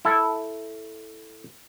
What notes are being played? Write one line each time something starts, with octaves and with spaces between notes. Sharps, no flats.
E4 A4